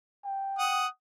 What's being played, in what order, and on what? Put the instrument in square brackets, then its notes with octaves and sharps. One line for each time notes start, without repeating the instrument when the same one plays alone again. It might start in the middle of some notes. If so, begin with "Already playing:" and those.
[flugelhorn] G5
[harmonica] F#5 D#6